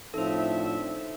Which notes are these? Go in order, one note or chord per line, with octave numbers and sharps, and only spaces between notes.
A2 F3 C4 D4 D#4 A4 C5 E5